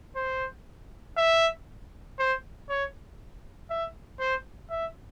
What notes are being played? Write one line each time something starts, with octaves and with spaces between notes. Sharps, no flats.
C5
E5
C5
C#5
E5
C5
E5